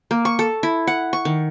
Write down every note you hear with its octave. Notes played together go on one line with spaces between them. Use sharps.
A#3
C#6
A4
E4
F#5
C#6
D#3